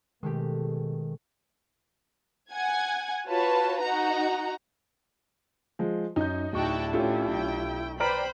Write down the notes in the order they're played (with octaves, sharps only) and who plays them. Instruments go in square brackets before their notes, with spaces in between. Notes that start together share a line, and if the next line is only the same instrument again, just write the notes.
[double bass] B2 [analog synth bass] D#3 [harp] G#3 A3 G4
[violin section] F#5 G#5 G#6
F4 F#4 B4 C#5 A5
D#4 F#4 F#5 A#5
[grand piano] F3 G#3
[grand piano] F#2 G6 [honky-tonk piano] D#4
[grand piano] D1 C#6 [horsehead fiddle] D4 E4 [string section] F#4 G5 A5
[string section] A2 C#4 [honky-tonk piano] A3 [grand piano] F4 G4
[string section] B1 G5
[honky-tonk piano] B4 D5 A#5 [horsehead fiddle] C5 [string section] G5 B5 [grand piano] F6 D7